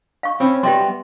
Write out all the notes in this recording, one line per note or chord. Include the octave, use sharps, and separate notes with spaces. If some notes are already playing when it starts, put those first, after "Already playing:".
F5 C#6
C4 C#4 C#5 B5
G3 B3 G4 E5 G5 C6